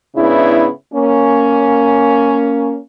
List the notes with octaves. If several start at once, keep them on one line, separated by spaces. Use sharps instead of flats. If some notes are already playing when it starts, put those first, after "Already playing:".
G#2 C#3 B3 D4 E4
A#3 C#4